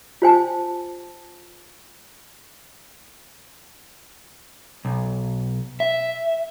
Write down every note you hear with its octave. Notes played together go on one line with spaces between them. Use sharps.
F4 C5 G#5 A5
B1
E5